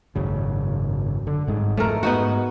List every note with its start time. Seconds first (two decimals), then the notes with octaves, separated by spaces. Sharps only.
0.16 G#1 F#2 C#3
1.27 D3
1.47 G1 G#2 G#3
1.77 F2 G#2 A3 A#4
2.03 G#2 B3 D#4 F#4